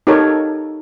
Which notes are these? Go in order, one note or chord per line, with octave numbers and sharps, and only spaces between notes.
D#4 G4 A4 A#4 C#5